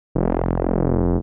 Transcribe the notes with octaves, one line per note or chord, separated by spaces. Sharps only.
F1